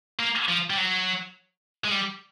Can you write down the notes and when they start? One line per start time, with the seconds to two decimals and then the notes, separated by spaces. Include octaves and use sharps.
0.19 A#3
0.49 F3
0.70 G3
0.77 F#3
1.84 G#3
1.91 G3